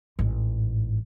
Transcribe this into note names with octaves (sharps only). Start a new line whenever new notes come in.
A1 G#2